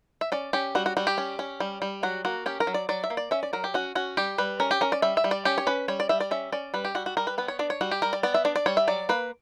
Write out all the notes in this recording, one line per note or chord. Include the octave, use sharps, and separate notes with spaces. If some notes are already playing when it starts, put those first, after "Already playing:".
E5
C#4 D5
C#4 G4
G3 F#4
F#4
G3 F#4
G4
C#4
C#4
G3
G3
F#3 F#4
A#3 F#4
C#4 G4
A#4
F#3
D5
F#3 D5
E5
A#3
D5
C#4 E5
D5
F#3 A#4
G4
C#4 F#4
C#4 F#4
G3 G4
G3 B4
C#4 A#4
G4
C#4 A#4
D5
G3 E5
E5
G3
D5
C#4 G4
C#5
C#4 B4
G3 C#5
D5
G3 E5
D5
C#4 E5
C#4 D5
G3 B4
G4
G3 F#4
F#4
G3 A#4
B4
B3 B4
C#5
D4 D5
C#5
G3 F#4
G4
G3 A#4
D5
B3 D5
E5
D4 D5
D5
G3 C#5
E5
F#3 D5
A#3 B4